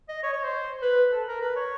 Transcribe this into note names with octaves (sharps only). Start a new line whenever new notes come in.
D#5
C#5
C#5
C5
B4
A4
A#4
B4
C#5